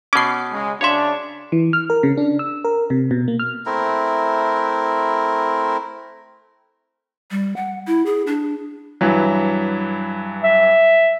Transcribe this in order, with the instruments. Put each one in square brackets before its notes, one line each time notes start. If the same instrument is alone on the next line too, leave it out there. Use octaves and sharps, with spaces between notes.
[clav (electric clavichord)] B2 C#4 [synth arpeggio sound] D6 C7
[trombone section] C#3 G#3
[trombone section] C#3 D4 [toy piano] F#4 F5 C6 [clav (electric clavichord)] C#5 E5
[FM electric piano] E3
F6
A#4
C#3
D4
E6
A#4
C3
B2
A#3
F6
[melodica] A3 C4 E4 A#4
[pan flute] G3
F#5
E4
G#4
D4
[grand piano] G2 E3 F#3
[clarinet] E5